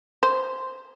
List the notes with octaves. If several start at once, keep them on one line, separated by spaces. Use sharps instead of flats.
C5